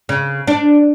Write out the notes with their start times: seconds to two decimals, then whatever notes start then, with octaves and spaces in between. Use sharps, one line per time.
0.09 C#3
0.47 D4